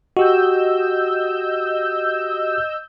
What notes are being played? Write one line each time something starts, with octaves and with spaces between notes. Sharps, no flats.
F#4 G4 D#5 E6 G6